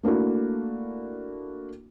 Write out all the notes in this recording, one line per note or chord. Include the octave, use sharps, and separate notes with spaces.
A3 A#3 D4 E4 F#4